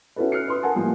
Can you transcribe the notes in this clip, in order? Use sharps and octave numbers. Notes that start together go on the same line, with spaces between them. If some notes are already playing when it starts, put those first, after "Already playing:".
C#4 E4 F#4 A4 B4
F6 F#6 C7 C#7
B4 C6 D#6
A#4 F#5 G#5 A5
A2 F3 G3 A#3 F4